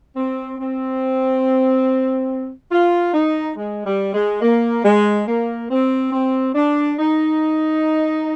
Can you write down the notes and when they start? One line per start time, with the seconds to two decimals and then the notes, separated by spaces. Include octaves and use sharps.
0.16 C4
0.58 C4
2.71 F4
3.13 D#4
3.56 G#3
3.85 G3
4.13 G#3
4.41 A#3
4.84 G#3
5.27 A#3
5.70 C4
6.12 C4
6.55 D4
6.98 D#4